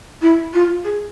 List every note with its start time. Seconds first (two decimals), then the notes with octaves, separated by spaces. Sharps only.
0.21 E4
0.53 F4
0.83 G#4